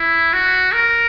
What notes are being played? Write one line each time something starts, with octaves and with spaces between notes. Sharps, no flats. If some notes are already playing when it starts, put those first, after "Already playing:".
Already playing: E4
F#4
A#4